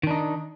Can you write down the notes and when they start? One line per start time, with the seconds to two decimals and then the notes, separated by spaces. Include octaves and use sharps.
0.03 D#3
0.07 D4
0.11 D#4